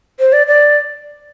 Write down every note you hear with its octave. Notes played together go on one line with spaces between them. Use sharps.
C5
D5
D5